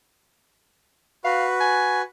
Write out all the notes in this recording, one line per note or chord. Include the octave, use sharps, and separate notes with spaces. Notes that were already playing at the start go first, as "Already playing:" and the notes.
F#4 B4 F5
G#5